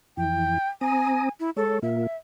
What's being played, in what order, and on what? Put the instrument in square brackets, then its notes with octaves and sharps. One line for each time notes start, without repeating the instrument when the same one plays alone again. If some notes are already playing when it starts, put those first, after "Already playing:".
[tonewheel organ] F2 E3 [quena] G5
[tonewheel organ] C4 A#5 D#6 [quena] G#5
[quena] E4
[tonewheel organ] G#3 C#5 [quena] A4
[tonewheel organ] A#2 A#3 F4 [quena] E5